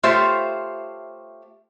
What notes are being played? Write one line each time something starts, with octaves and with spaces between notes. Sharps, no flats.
A3 F4 G4 C5 C#5 E5